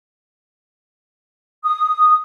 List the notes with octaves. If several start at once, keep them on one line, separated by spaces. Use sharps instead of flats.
D#6